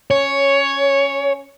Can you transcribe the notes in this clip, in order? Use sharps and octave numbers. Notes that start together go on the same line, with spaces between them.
C#4 C#5